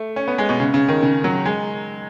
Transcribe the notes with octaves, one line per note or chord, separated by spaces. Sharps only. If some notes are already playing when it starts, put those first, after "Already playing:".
Already playing: A3
C#4
B3
G#3
B2
C#3
C#3
D#3
C#3
F#3
G#3